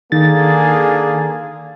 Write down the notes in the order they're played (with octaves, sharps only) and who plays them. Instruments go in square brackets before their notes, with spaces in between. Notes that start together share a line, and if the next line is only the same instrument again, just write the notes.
[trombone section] D3 A#3 G#4 [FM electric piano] D#3 A6